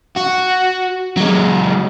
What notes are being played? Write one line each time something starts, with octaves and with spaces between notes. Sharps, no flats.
F#4
F#3 G#3